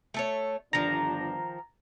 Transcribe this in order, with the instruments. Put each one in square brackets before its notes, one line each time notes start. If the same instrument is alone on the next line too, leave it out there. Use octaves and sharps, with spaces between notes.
[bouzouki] A3 A4 C#5
[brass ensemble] G1 D4 [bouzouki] D#3 F3 [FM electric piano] A#5